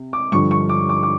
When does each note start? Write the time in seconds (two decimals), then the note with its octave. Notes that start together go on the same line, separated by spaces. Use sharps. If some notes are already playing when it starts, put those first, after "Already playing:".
Already playing: C3
0.13 D6
0.32 G2 D3 F3 C#6
0.51 C#6
0.69 D6
0.89 D6
1.03 D6